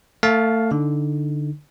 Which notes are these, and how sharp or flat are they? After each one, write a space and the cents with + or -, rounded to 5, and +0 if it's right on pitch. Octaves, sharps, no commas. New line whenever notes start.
A3 +30 F5 +10 A5 -10
D3 +0 D#4 +0